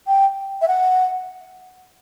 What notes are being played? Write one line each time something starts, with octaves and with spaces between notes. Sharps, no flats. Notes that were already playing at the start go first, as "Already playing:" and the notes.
G5
E5
F#5